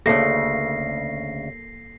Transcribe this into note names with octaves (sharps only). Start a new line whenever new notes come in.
D2 C#3 A#3 A4 A#6 C7